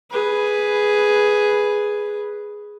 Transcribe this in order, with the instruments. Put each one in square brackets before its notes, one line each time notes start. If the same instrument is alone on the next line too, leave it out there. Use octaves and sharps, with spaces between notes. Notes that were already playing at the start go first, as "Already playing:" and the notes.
[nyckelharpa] G#4 B4